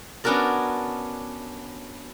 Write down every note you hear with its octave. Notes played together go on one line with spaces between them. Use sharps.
B3 C#4 D4 F#4 A#4 D5